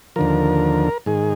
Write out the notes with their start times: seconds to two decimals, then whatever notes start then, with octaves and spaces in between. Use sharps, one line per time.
0.16 D#2 D3 F3 A#4
1.06 G#2 D#3 G#4